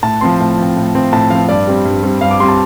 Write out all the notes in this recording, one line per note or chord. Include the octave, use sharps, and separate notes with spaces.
A2 A5
F3 C4 C6
A2
F3 C4
A2
F3 C4
A2 A5
F3 C4 F5
G2 D5
G3 C4
G2
G3 C4
G2 F5
D6
G3 C4 C6
A5